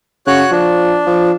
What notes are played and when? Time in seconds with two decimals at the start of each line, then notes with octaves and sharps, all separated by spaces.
0.27 C#3 F#4 C#5 F#6
0.51 F3 D4
1.06 F3